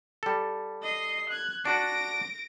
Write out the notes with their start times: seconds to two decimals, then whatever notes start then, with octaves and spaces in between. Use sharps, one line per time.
0.23 G3 A4
0.82 D#5 C7
1.29 F#6 G#6
1.65 D4 F#4 D5 A#6 D7